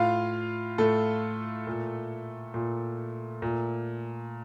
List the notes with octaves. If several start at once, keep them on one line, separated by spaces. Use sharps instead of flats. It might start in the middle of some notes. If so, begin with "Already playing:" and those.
Already playing: A2 F4 F5
A2 A3 A4
A#2
A#2
A#2